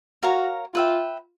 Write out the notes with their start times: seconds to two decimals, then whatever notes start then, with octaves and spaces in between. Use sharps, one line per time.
0.23 F#4 A#4 C#5 F5 A#5
0.74 F4 B4 E5 G5